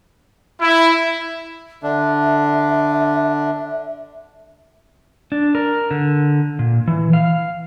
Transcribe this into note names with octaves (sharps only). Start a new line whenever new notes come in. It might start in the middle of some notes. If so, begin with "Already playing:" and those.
E4
D3 D4 E5
D4
A#4
D3
A#2
E3
F5